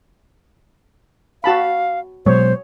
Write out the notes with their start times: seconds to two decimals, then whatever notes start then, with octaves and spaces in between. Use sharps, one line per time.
1.44 F#4 F5 A5 B5
2.26 B2 F#3 G#3 C5 C#5